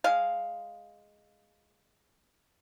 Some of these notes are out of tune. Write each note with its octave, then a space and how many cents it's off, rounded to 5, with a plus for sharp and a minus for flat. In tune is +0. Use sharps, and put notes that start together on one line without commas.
G#3 +0 F5 +0